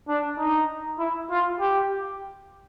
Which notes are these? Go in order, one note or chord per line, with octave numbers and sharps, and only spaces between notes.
D4
D#4
E4
F4
G4